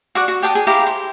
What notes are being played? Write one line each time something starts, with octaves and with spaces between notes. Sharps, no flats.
F#4 D5 F#5
F#4
G4 G5 A5 D#6
G#4
E4 G4 F5 A#5
C5